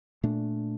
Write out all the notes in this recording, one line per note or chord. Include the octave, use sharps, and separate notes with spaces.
A#2 A3 D4